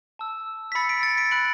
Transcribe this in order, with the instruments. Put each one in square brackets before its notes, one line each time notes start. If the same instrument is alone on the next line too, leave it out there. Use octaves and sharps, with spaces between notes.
[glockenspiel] A5 E6
B6
B5 E6 A6 C#7
B6 D7
A6 C#7
B6 D7
B5 F#6 D7 F#7